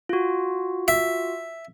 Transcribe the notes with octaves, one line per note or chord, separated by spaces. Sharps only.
F4 F#4
E5